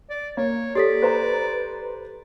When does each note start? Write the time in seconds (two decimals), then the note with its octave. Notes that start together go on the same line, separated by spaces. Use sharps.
0.10 D5
0.37 A#3 C#5
0.75 G4 A4 D5 B6
1.02 B4 C5 A#5